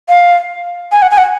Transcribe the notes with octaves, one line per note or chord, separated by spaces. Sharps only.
F5
G#5
F#5
G#5
F#5